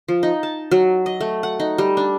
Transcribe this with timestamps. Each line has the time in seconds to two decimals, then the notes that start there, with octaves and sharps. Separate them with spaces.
0.08 F3
0.23 D#4
0.43 A5
0.71 F#3
1.06 D#5
1.20 A3
1.43 F#5
1.60 D#4
1.78 G3
1.97 D4